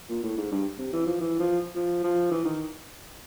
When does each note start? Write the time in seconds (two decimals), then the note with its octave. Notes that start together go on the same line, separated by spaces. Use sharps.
0.09 A#2
0.23 A2
0.37 G#2
0.51 G2
0.78 C3
0.93 E3
1.06 F3
1.20 E3
1.39 F3
1.75 F3
2.03 F3
2.31 E3
2.45 D#3